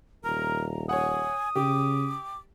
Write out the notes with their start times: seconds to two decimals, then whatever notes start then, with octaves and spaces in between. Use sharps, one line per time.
0.25 D#1 A#4 A#5
0.89 C#5 F#5 G#5 D#6
1.56 C#3 G4 D6